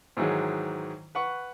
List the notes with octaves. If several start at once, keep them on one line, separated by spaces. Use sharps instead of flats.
G#2 D#3 E3 F#3 G#3
B4 F#5 C#6